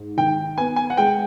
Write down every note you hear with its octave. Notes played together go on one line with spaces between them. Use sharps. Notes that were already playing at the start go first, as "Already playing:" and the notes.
Already playing: G#2
D#3 G5
B3 G#5
G#5
F#5
G#3 G5